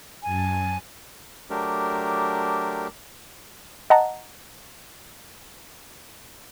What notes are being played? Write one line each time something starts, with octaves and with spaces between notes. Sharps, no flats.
F#2 G#5 A5
F#3 A3 D4 G4 A#4
D#5 F#5 A5 A#5